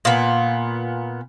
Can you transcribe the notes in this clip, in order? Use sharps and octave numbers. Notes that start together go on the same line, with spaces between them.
A#2 B3